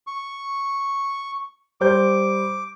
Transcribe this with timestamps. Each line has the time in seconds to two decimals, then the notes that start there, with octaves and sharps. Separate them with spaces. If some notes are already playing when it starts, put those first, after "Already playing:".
0.07 C#6
1.81 G3 C5 D6 G6